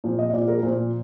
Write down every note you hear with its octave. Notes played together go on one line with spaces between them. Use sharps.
A#2 F3
D#5
A#2 F3 D5
A#4
A#2 F3 C5